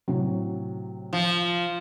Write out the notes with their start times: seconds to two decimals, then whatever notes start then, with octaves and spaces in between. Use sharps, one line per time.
0.08 A2 C3 F#3
1.13 F3